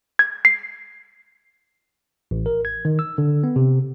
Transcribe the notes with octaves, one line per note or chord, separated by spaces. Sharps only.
G#6
C7
A1
A#4
G#6
D#3
E6
D3
B3
C3